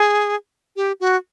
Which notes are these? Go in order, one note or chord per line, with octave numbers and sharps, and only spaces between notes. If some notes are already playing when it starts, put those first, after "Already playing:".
Already playing: G#4
G4
F#4